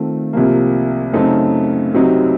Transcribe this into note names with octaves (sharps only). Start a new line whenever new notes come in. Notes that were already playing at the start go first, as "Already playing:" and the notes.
Already playing: D#3 A3 C4 F4
C2 C3 F3 A#3
F#2 C#3 A3 C4 D#4
C2 C3 F#3 C4 D#4